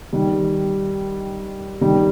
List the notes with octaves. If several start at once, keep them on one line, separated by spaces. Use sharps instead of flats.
D#3 G3
D#3 G3